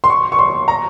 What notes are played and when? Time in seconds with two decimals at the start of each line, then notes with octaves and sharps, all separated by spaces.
0.04 C6
0.10 C#6
0.32 C#6
0.39 C6
0.68 A#5